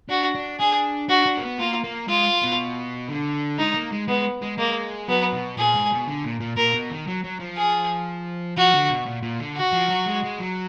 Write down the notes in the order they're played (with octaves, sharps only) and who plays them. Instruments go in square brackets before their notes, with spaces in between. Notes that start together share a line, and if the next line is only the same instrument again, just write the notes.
[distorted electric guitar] D4 [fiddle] F#4
[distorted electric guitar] D4
[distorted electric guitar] D4 [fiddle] G#4
[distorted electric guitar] D4 [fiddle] F#4
[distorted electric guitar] D4
A#3
B3
[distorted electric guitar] A#3 [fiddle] F4
[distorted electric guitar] A#3
[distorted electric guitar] G#3 [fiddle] F4
[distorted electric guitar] B2
D3
[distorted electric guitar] G#3 [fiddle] D#4
[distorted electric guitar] A#3
G#3
[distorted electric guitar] G#3 [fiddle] B3
[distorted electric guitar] G#3
[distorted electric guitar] G#3 [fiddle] A#3
[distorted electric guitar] F#3 [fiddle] B3
[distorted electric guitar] B2
[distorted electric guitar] A#2 [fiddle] G#4
[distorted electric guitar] G#2
B2
D3
A#2
A#2
[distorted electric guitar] A#2 [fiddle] A#4
[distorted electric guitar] B2
D#3
F#3
F#3
F3
[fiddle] G#4
[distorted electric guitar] F3 [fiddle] F#4
[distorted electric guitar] D3
B2
A#2
A#2
D3
[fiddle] F#4
[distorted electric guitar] F3
F#3
G#3
G#3
F#3